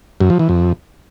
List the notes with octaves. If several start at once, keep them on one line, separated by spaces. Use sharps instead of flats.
F#2
F3
E3
F2